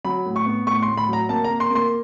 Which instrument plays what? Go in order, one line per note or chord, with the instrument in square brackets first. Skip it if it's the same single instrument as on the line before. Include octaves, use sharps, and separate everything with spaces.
[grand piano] F#3 B5
A2
C#6
B3
A2 C#6
C6
A2
B5
F#3
A#5
A#3 A5
A#5
A#3
C6
A#3 C6